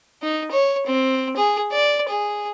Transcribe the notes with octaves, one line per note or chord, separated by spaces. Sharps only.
D#4
C#5
C4
G#4
D5
G#4